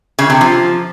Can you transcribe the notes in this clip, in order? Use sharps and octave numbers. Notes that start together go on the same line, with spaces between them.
C#3
C3
F3